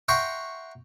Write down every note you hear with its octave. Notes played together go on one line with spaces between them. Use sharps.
E5 F#5 G5 A#5 C6 C#6